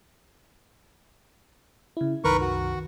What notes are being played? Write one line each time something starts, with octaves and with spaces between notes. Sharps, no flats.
C#3 E4
C2 F#2 D#3 A#4 B4 C#6
F#4